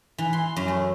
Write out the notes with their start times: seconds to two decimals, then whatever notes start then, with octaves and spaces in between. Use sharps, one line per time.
0.18 E3
0.33 C6
0.56 F#2
0.68 A3